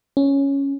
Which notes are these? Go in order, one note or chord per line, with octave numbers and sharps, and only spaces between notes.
C#4